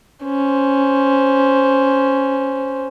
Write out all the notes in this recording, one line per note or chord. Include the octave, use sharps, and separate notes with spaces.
C#4 C5